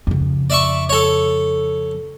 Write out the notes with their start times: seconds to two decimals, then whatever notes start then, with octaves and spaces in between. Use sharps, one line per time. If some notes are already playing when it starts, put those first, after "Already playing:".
0.07 F2 C#3
0.50 D5 E5 C#6
0.89 A4 C#5